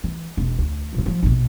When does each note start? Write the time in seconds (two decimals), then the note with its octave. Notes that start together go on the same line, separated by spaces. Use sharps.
0.04 E3
0.37 E1
0.59 D2
0.94 A#2 F3
1.06 F3 F#3
1.23 A#1 B2